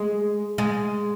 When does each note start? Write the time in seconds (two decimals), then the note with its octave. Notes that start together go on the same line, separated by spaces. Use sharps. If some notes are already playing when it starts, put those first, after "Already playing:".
Already playing: G#3
0.58 G#3